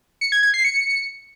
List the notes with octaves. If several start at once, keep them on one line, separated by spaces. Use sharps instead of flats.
C#7
G#6
G#6
C7
C#7